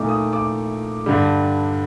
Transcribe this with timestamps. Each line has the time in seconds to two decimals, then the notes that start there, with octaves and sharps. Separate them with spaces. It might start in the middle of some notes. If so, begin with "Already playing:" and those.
Already playing: A#2 A3 D#4 D6
0.09 D#6
0.33 D6
1.06 G2 D3 G3